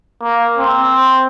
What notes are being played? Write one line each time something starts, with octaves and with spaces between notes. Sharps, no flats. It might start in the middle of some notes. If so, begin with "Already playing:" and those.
A#3
C4